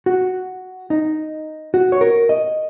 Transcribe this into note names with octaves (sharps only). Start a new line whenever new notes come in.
F#4
D#4
F#4
C#5
A#4
D#5